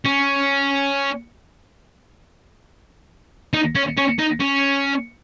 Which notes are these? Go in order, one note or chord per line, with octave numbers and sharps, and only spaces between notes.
C#4
D#4
C#4
C#4
D#4
C#4